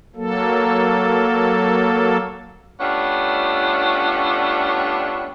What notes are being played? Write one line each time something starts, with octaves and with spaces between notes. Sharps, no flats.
F#3 A#3 A4
G3 A3 B3 C#4 D4 F4